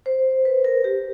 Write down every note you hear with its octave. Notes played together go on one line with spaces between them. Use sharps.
C5
B4
A#4
G4